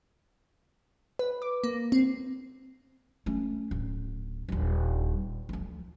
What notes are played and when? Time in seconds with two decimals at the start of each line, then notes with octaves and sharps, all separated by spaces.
1.19 B4
1.42 D6
1.64 A#3
1.92 C4
3.26 A3 C#4
3.71 D1
4.49 D#1 D3
5.49 D2 F3